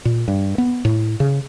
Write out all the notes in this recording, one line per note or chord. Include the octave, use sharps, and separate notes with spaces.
A#2
G2
B3
A2
C#3